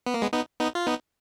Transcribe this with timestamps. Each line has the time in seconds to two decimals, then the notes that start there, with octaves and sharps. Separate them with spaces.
0.06 B3
0.14 A#3
0.22 G#3 B3
0.33 B3 D#4
0.60 B3 D#4
0.75 F4
0.87 B3 D#4